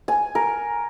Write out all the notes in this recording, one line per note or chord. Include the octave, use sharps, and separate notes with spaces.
G#5
A#4